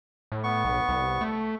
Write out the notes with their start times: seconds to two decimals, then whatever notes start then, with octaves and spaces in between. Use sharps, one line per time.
0.32 A2
0.44 B3 C#6
0.65 B1
0.89 C2
1.21 A3